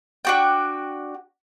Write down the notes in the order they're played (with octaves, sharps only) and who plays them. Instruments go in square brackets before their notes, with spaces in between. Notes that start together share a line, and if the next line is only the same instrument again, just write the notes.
[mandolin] D4 F#4 G5